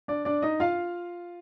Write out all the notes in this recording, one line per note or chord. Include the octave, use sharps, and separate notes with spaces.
D4 D5
D4 D5
D#4 D#5
F4 F5